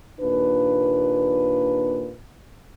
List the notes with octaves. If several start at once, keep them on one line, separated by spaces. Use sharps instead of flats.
D#2 A#2 D4 B4